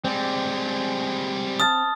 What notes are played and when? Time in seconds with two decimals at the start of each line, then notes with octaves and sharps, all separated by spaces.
0.04 G3 G#3 C4 D5
1.60 A5 D#6 F6 A6